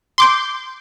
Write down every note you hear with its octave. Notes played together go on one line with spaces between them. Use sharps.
C6 D6 G6